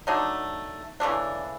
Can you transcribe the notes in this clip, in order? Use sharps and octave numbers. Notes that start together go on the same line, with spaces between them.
F#3 A3 D4 D#4
C#3 E3 A3 D4